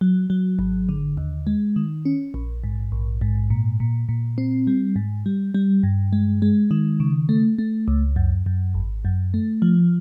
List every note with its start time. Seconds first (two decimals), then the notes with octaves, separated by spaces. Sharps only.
0.01 F#3
0.30 F#3
0.59 G#1
0.89 D3
1.17 D#2
1.47 G#3
1.76 D#3
2.05 C#4
2.34 A#1
2.64 G#2
2.92 A#1
3.21 G#2
3.50 A#2
3.80 A#2
4.09 A#2
4.38 C4
4.67 G3
4.96 G#2
5.26 G3
5.54 G3
5.83 G2
6.13 G#3
6.42 G#3
6.71 D#3
7.00 C#3
7.29 A3
7.58 A3
7.88 C#2
8.16 F#2
8.46 F#2
8.74 G#1
9.05 F#2
9.34 A3
9.62 F3